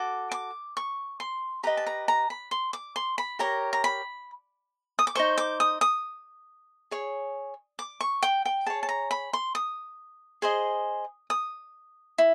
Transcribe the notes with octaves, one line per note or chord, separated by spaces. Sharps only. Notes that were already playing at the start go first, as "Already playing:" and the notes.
Already playing: F#4 A4 D6
D6
C#6
C6
G4 B4 D#5 A#5
A5
A#5
A#5
B5
C6
D6
C6
B5
G4 A#4 C#5 A#5
A#5
B5
D#6
D6
D#4 G#4 C5 C#6
D6
D#6
D#6
G#4 C#5
D6
C#6
G5
G5
G#4 C#5 A5
A5
A#5
B5
C6
D#6
G#4 C5 D#5
D#6
E4